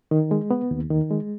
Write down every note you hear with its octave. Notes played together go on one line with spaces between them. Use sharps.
D#3
G#3
B3
D#2
D#3
G#3